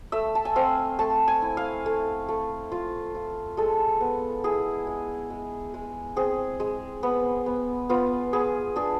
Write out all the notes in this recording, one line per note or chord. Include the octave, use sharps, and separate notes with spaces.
A3 E5
A5
G#5
C4 F5
A3 A5
G#5
E4
F5
A3
A3
F4
F4
G#3 A4
B3
E4 G#4
G#3
G#3
G#3
C4 G#4
G#3
B3
B3
B3 F4
B3 G#4
D4 G#4